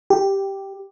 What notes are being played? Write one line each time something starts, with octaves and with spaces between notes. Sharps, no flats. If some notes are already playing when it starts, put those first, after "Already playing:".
G4